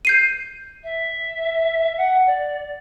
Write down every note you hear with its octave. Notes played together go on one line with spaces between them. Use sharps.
G6 C7 D#7
E5
F#5
D5